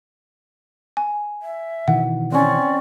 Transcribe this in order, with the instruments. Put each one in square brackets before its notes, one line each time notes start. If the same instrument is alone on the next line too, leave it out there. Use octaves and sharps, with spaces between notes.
[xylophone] G#5
[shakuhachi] E5
[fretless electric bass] B2 D#3 E3 [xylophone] F#5
[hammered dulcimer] C4 C#4 [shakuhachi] D5